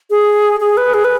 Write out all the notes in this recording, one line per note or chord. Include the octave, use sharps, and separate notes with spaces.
G#4
G#4
B4
G#4
B4